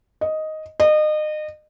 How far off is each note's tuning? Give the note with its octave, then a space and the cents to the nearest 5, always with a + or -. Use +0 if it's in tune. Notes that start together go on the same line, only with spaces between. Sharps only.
D#5 +5
D#5 -30